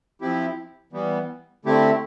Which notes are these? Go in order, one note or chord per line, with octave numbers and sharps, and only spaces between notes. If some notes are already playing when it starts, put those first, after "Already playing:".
F3 C4 E4 G4
E3 G3 B3
D3 A3 C4 E4 G4